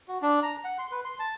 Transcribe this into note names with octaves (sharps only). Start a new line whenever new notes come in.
F#4
D4
A#5
F#5
C6
B4
C6
A5